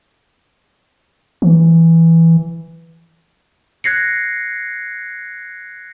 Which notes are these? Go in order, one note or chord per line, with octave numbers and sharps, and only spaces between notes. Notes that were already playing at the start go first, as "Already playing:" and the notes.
E3
F#6 G#6 A#6 C7 C#7